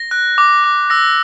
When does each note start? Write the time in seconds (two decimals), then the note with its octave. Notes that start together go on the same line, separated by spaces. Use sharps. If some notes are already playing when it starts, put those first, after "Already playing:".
Already playing: A#6
0.11 F#6
0.38 D6
0.64 D6
0.90 E6 A#6